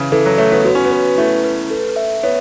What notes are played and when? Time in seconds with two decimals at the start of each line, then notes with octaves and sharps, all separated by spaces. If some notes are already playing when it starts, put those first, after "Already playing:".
Already playing: C#3 E3
0.12 E3 A4
0.26 F#3
0.38 A3 C#5
0.52 B3
0.65 B3 F#4
0.75 C#4
0.85 B3
0.92 B4
1.18 A3 E4
1.44 B4
1.70 A4
1.96 E5
2.23 B3 C#5